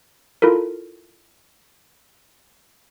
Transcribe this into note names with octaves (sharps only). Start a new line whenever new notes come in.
E4 F4 A4 A#4